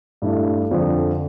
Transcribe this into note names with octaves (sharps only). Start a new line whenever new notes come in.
G2 E3 A3 D4
F2 D3 F3